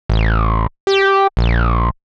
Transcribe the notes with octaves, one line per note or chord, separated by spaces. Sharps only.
A1
G4
A#1